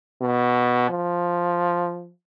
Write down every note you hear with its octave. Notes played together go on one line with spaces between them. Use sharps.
B2
F3